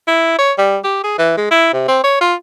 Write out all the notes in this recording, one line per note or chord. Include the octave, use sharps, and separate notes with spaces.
E4
C#5
G3
G4
G#4
E3
G#3
E4
C3
C4
C#5
F4